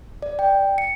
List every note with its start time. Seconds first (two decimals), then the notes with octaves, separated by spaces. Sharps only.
0.22 D5
0.39 G5
0.78 C#7